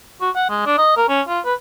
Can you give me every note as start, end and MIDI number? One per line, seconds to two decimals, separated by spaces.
0.21 0.30 66
0.36 0.46 78
0.49 0.63 56
0.66 0.76 62
0.78 0.95 75
0.97 1.05 70
1.09 1.21 61
1.28 1.40 65
1.45 1.54 71